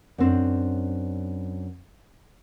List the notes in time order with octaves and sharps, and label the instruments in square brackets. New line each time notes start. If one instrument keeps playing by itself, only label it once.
[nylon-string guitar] F#2 C4 D4